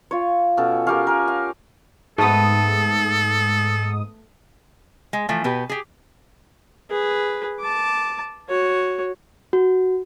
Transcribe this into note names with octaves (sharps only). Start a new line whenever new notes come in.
F4 C#5
B2 C#4 A4
C#4 G4 A#4 F5
A#4 G#5
F5
G#2 A3 B3 A4 D#6
G#3
E3 F3 A3
B2 G4 B4
G4 G#4
G#4 B4
A5 D6
F#4 C#5
F#4